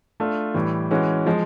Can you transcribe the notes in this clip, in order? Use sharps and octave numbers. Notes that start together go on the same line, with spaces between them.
A3 D4 F4
A2 E3 G3
E3 G#3 C#4 F#4
F3 G#3